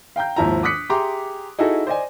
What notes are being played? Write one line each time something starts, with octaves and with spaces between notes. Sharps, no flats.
F5 G5 A#5 G6
D#2 G#2 F3 E4 A5 A#5
D6 D#6 F#6 B6 C#7
G4 G#4 E5 A#5 C6 D6
D#4 E4 F#4 G#4 A4
C5 D5 D#5 G#5